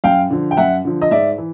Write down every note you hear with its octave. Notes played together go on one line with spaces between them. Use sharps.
F#2 F5 G5
D3 F3
G5
F#2 E5 F#5
D3 F3
D#5
G#2 D5 E5
E3